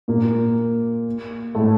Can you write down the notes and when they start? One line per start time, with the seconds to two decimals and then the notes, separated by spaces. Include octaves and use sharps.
0.08 A#2 A#3
1.55 A2 A3